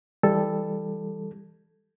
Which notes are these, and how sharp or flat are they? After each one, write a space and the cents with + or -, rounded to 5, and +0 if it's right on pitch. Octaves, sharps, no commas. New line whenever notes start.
E3 +0 G3 +20 A4 +0